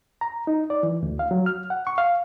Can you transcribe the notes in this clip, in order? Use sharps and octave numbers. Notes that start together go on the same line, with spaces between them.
A#5
D#4
D5
E3
D2
F5
F#3
F6
F#5
C#6
F5